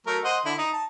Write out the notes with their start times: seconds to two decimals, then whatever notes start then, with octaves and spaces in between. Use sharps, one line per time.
0.07 F#3 A3 A#4
0.24 C5 D#5 F#5
0.45 D3 E4
0.59 D#4
0.73 A5